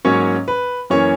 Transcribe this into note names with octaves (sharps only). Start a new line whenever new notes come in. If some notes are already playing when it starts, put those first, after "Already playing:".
G#2 F#3 A#3 C#4 C#5
B4
F#2 E3 A#3 C#4 C#5